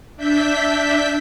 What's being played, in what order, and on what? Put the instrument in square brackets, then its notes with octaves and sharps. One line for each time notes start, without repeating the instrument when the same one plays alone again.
[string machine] D4 E5 G6 B6